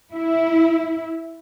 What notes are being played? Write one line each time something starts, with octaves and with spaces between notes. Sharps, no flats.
E4